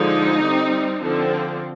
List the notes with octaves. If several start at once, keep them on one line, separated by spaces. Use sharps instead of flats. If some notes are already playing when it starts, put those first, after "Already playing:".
Already playing: D3 F3 G#3 D#4
G3 C4
D3 F3 C4